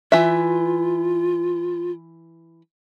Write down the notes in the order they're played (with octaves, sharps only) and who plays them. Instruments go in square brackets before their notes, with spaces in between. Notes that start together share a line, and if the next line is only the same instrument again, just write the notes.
[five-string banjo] E3 E5 [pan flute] F4